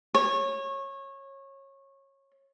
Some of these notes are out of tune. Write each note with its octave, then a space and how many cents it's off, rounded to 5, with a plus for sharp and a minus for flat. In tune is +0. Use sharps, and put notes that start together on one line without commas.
C#5 -20